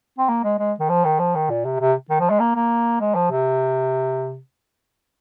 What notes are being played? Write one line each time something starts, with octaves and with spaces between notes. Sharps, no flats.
C4
A#3
G#3
G#3
D#3
F3
D#3
F3
D#3
A#2
C3
C3
D#3
F3
G#3
A#3
A#3
G#3
F3
C3